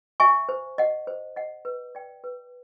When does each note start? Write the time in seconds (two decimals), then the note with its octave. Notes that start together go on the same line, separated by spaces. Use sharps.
0.20 E5 G#5 C#6
0.49 C5
0.78 D#5 F#5
1.07 C5
1.36 D#5 F#5
1.65 B4
1.95 D5 G5
2.24 B4